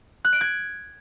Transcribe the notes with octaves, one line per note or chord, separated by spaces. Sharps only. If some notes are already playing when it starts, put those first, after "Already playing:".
F#6
D7
G#6